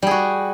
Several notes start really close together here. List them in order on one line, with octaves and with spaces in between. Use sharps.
G3 G#4 F#4